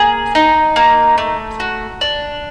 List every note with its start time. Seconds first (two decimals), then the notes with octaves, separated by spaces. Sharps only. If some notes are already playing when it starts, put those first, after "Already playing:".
Already playing: A#3 G#4
0.35 D#4
0.76 A#3
1.18 A3
1.60 F#4
2.01 D4